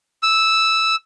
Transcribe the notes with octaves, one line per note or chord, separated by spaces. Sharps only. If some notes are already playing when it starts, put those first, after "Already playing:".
E6